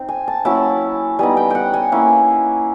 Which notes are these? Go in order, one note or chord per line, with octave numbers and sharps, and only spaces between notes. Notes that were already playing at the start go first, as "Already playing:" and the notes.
Already playing: C4 D#4
G#5
A5
F#3 A#3 C#4 E4 A5
G3 B3 D#4 G#5
G5
F#5 G5
G#5
A#3 C#4 E4